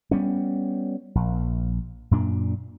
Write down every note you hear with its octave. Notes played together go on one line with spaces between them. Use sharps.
G3 B3 C#4
A#1
F#2 A#2 D4